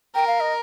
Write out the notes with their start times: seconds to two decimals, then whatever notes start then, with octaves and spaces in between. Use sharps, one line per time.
0.15 A#4 G5
0.27 F5
0.40 D#5